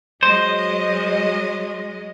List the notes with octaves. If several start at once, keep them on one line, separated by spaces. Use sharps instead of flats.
F#3 G#3 C5 D#5